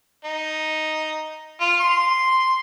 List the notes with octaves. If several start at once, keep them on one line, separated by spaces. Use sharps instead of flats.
D#4
F4
C6